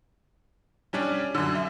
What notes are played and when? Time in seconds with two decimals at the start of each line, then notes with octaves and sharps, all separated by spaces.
0.93 G3 C#4 D4
1.35 F#2 D3
1.55 E5